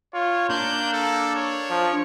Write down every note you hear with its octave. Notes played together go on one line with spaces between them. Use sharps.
F4 C#5
A#3 D4 G6
A4
C#5
F3